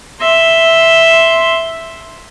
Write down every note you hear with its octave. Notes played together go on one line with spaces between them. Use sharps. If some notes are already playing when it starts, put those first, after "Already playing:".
E5 C6